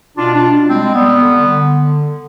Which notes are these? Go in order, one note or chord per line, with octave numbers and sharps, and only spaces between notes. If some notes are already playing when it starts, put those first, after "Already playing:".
B2 D4 F4
D4 F4
B2
G3 G#3 C4
G#3
G3 B3
D3
D3